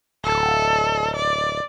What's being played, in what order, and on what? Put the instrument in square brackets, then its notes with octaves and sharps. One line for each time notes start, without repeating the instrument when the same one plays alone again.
[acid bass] D1 [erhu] A4
[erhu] D5